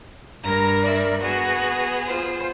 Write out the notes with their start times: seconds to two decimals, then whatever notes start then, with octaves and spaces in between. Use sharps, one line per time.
0.44 G2 A#4 A#5
0.83 D5 E5
1.22 B3 F#4 G#4
2.06 F4 C5